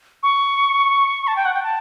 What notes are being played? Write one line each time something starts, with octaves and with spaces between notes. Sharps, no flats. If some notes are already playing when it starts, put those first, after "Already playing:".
C#6
A5
G5
F#5
G5
A5